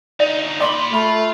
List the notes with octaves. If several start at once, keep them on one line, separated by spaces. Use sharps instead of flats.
D2 D#4 D5
A#2 D5 B5 C6 D6
A3 F4 B5